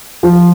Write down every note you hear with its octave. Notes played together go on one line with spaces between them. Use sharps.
F3